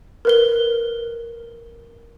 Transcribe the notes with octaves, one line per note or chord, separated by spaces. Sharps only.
A#4 B4 G7